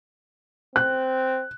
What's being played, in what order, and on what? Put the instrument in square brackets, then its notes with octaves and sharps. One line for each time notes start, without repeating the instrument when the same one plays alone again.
[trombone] C4 [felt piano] F#6